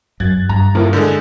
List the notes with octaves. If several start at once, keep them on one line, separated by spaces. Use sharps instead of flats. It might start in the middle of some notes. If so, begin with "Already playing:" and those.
F#2 F#6 G#6 A6
G2 A#5
A2 F3 A#3
D3 G#3 G6